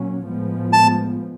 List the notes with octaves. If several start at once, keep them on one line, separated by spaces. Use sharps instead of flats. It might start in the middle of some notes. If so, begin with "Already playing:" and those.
Already playing: A#2 F#3 A#3 C#4
A2 F3 G#3 B3
A5